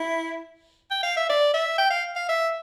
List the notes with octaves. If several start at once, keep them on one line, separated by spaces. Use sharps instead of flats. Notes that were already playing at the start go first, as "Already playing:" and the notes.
Already playing: E4
G5
F5
E5
D5
E5
G5
F5
F5
E5